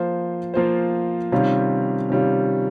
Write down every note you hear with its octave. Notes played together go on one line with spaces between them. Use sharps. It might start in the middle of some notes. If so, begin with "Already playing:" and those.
Already playing: F3 A#3 F4 C5
F3 A#3 F4 C5
C3 D#3 G3 C#4 F4
C3 D#3 G3 C#4 F4